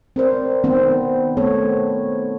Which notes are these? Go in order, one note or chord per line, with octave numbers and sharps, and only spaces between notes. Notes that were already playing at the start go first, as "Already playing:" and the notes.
C4 A#4 C5 D5
D#3 B3 C4 C5
A3 B3 C4 A4 C#5